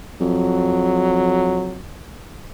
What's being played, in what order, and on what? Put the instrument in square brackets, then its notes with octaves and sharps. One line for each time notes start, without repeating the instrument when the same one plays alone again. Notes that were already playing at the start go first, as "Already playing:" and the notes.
[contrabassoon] F2 [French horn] F#3